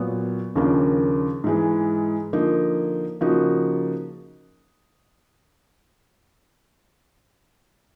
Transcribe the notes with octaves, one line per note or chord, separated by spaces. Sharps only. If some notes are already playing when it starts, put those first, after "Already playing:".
Already playing: A#2 F#3 B3
D#2 C#3 F3 A#3 D4
G#2 E3 G#3
D3 F3 A#3 D#4
C#3 F3 A#3 D#4 F#4